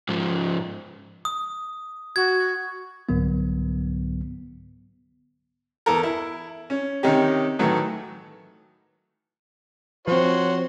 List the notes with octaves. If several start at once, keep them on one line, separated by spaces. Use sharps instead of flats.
G#2 F3
D#6
F#4 G#6
C2 G#2 D3 F#3 B3
E2 A4 A#4
E4
C#4
C3 D#3 C#4 D#4 G4
A2 D#3 E3 F#3 A3
F3 C4 F#4 C5 C#5